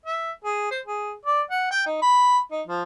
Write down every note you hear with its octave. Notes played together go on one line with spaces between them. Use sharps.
E5
G#4
C5
G#4
D5
F#5
G5
D#4
B5
D#4
F3